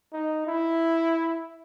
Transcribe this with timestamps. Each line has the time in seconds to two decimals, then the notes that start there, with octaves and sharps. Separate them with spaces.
0.13 D#4
0.47 E4